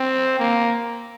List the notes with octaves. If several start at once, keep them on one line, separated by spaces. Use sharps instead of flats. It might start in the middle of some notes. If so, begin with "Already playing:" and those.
Already playing: C4
A#3